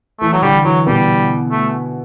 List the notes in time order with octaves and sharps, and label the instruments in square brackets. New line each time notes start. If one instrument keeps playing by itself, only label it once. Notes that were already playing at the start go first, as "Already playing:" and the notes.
[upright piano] E3 [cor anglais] A3
[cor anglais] F#3
[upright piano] D3 [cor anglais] G3
[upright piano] E3 [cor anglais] F#3
[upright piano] B2 B3 [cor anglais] G3
[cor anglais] A3